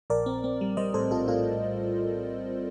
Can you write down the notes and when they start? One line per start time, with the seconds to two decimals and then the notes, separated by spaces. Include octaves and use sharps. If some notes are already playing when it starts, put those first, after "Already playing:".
0.10 A#1 A#4 D5
0.26 C4
0.44 C4
0.61 G3
0.77 G3 C5 D#5
0.94 A2 A4 C5
1.11 A#1 F4 A4
1.28 A2 F4 A4